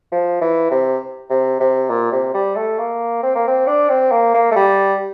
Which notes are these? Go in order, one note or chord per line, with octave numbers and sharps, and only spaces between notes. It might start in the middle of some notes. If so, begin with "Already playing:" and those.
F3
E3
C3
C3
C3
A#2
C3
G3
A3
A#3
C4
A#3
C4
D4
C4
A#3
A#3
A3
G3